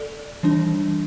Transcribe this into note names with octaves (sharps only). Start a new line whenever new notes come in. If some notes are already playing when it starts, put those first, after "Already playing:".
Already playing: A4 D5
E3 G3 D4